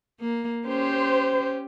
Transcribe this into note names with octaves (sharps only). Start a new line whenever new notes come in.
A#3
C#4 G4 C5